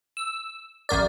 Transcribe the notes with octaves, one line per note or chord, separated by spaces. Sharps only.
E6
A1 F#2 A#4 D5